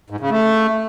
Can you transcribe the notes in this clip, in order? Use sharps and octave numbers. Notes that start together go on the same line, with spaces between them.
G#2
C#3
A3